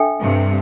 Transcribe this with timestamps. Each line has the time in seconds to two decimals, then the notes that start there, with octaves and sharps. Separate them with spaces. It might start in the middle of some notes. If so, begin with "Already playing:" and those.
Already playing: D4 A4 E5 G5
0.20 G2 C3